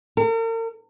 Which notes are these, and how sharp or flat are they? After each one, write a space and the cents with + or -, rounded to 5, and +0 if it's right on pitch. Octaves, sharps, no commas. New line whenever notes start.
A#4 -45